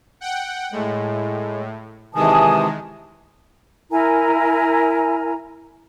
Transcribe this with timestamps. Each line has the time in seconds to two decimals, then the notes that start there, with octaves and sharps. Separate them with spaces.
0.21 F#5 G5
0.72 A2 G#3
2.15 C3 D#3 E3 G#3 G#5 A5 D#6
3.91 E4 A#4 G#5 A#5